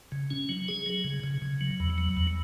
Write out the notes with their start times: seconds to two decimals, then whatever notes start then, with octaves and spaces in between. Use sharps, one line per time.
0.12 C#3
0.31 C#4
0.49 F#3
0.68 G#4
0.86 F#3
1.04 C#3
1.23 C#3
1.42 C#3
1.61 F#3
1.80 E2
1.98 F#3
2.17 E2